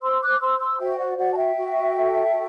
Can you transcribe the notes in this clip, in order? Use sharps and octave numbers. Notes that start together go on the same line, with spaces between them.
C5 C6 E6
D6 F#6
C5 C6 E6
C6 E6
F#4 E5 G5
D5 F#5
F#4 D5 F#5
A5
E5 G5
F#4
A4
F#4